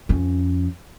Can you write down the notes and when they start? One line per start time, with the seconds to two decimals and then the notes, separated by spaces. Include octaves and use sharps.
0.09 F2 C#4